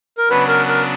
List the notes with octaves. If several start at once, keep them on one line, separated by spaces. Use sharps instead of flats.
A#4
C#3 F#3 B3 D4 B4
A#4
A#4